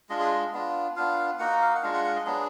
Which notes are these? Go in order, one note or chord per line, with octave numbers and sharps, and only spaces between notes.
G#3 D4 F4 D#5
G#4
D#5
B3 D4 F4
B3 D4 F4 F5
A#3 D#4 F#4 F#5
F5
F#5
G#3 D4 F4 F5
F#5
F#5
D#5
F#3 B3 D4 G#4